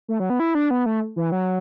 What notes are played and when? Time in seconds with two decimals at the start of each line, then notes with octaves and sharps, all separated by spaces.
0.08 A3
0.20 F#3
0.30 B3
0.40 E4
0.55 D4
0.71 B3
0.86 A3
1.16 E3
1.32 F#3